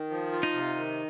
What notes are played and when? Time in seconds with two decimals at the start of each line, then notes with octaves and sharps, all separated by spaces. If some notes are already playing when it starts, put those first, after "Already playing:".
Already playing: D#3
0.10 F3
0.32 F4
0.43 D#4
0.53 C3
0.76 D#3